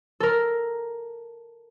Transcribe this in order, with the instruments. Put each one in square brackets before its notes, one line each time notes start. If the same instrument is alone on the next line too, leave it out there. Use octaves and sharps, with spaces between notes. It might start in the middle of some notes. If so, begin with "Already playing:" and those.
[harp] A4 A#4